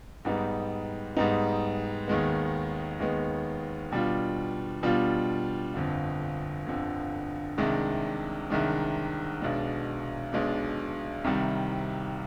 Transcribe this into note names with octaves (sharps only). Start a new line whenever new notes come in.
G#2 G3 B3 D#4
G#2 G3 B3 D#4
D#2 D#3 G#3 B3
D#2 D#3 G#3 B3
B2 G3 D4 F4
B2 G3 D4 F4
G1 F2 D3
G1 F2 D3
C2 C3 D#3 G#3 D4
C2 C3 D#3 G#3 D4
B1 B2 G#3 D4
B1 B2 G#3 D4
C2 C3 D#3 G3